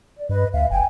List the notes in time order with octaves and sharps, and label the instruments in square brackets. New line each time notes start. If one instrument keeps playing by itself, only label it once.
[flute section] D5
[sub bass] G2 [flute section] B4 D#5
[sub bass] D2 [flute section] E5 F5
[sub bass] F#1 [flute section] G5 G#5